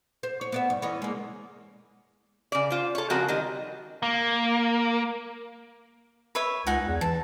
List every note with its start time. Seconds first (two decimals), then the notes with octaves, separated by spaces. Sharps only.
0.23 C5
0.41 C#5
0.52 B3 D5 E5
0.70 G2
0.82 E3 C#4 D#5
1.02 G#3 A#3
2.52 C#3 D5
2.70 F4 C5
2.95 A4 C#5
3.10 C#3 F3 G#3 C4 F#4 A#4
3.28 D#3 G3 D#5
4.03 A#3
6.35 B4 C#5 E5
6.67 C#2 D#4 F#5 G#5
6.86 E2
7.01 E3 A5